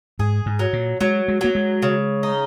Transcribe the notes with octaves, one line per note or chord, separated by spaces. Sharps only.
G#2 G#4
G#2
F#3
A#2
F#3 G#3
G#3
F#3 A#3
G#3
C#3
D#4